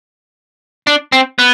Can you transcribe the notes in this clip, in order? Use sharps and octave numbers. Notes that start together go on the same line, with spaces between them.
D4
C4
B3